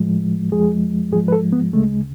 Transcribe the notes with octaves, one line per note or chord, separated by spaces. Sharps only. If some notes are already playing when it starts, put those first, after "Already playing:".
Already playing: A2 F3 G#3
F2 F3 G#3 G#4
G#2 F3 G#3 G#4
B4
A4
B3
D2 C#3 G#3 A3